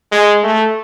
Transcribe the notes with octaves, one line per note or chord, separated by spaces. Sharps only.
G#3
A3